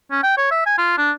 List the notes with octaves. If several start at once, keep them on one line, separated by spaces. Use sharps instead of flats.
C#4
G5
C#5
E5
G#5
F4
D4